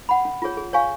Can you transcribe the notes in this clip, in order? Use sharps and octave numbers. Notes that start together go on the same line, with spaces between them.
F#5 B5
C#4
F4 G#4 C#5
G#4
C#5 F5 G#5 C#6